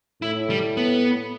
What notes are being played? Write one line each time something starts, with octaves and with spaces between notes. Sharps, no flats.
A2 E4
G3
B3